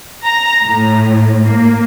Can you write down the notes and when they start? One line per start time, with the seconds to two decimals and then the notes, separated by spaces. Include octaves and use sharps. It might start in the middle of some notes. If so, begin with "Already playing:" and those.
0.24 A#5
0.65 A2
1.46 A#3